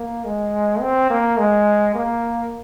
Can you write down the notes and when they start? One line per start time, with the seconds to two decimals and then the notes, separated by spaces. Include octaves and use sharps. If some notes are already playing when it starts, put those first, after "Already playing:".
Already playing: A#3
0.25 G#3
0.81 C4
1.11 A#3
1.38 G#3
1.95 A#3